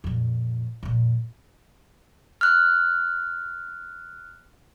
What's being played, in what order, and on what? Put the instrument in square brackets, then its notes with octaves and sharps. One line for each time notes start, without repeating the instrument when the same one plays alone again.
[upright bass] F2 A#2
F2 A#2
[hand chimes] F6 F#6